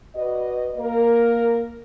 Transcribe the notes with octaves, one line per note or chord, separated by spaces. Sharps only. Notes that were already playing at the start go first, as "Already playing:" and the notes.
F#4 B4 D5 D#5
A#3 A#4